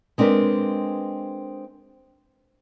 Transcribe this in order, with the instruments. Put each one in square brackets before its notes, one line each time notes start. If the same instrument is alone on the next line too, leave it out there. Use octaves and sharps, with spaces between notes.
[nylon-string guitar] G#3 C4 D4 A#4 B4